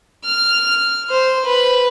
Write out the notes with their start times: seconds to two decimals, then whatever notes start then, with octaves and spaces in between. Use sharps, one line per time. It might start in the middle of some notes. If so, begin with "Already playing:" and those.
0.25 F6
1.10 C5
1.46 B4